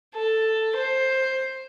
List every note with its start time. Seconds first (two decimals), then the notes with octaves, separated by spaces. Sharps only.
0.15 A4
0.76 C5